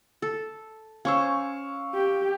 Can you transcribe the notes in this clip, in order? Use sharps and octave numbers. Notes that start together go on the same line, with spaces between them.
A4
C#4 C5 F5 C#6 E6
G4